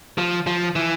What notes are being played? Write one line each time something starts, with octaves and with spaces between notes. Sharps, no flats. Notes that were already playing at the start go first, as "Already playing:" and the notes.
F3
F3
E3